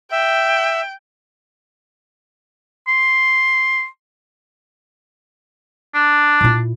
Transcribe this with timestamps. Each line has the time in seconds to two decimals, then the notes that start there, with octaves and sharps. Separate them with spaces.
0.12 E5 G5
2.88 C6
5.94 D4
6.41 A#2 E4